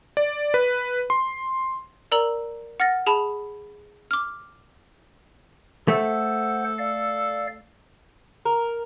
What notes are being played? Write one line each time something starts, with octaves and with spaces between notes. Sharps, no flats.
D5
B4
C6
A#4 D5 A#5 E6 F#7
F#5 F6 A6 A#6
G#4 A5 B5
D6 F6
A3 A4 C5 F#5
D5 F5
A#4